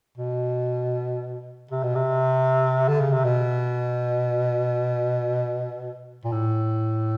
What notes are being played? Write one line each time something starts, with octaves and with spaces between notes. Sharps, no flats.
B2
C3
B2
C3
D3
C#3
C3
B2
A#2
A2